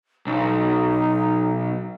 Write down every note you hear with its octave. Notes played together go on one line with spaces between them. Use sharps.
B1 D#4